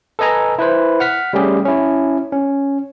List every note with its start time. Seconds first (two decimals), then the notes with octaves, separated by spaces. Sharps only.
0.19 A4 B4 D#5 G#5 A#5
0.59 E4 B4 C5
1.00 F#5 F6 B6
1.33 G3 A3 C#4 G4 G#4
1.65 C#4 E4
2.32 C#4